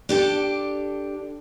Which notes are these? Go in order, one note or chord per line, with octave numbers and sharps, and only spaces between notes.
D4 G4 A4